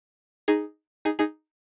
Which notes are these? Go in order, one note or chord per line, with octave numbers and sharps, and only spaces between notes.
D#4 G#4
D#4 G#4
D#4 G#4